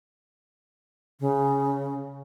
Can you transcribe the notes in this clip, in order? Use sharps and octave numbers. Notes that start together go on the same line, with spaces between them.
C#3